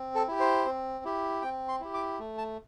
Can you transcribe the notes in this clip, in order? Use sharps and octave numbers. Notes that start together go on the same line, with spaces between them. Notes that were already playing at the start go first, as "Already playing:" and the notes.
Already playing: C4
A4
E4 G4
C5
C4
E4 G4
C4 G5
C6
E4 G4
D6
A3
A5